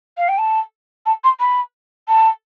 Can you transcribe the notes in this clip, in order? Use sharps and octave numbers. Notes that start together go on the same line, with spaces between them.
F5
G5
A5
A5
C6
B5
A5